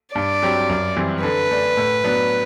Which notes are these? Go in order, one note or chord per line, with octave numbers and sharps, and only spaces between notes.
G2 D5
F#3 C4 G4
F#2
E3 G3 C4
D3 B4
A3 D4
A2
F#3 B3 D4